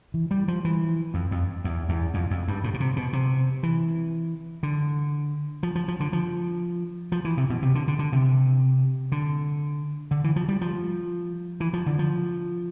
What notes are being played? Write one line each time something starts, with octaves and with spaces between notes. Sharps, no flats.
E3
G3
F3
E3
F2
F2
E2
E2
F2
F2
G2
A2
B2
C3
B2
C3
E3
D3
F3
F3
F3
D3
F3
F3
E3
C3
B2
C3
D3
D3
D3
C3
D3
D3
E3
F3
G3
F3
E3
F3
D3
F3